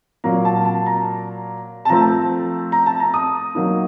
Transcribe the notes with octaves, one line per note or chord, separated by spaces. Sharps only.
A#2 F#3 A#3 A#5
A5
A5
A#5
A5
F3 A3 C4 A#5
A#5
A5
A#5
D#6
F#3 A#3 D#4